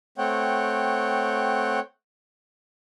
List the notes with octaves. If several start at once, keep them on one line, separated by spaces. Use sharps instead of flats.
A3 C4 C#5 F#5 G5